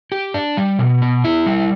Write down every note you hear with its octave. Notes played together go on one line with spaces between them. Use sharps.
G4
D4
G3
B2
B3
E4
G3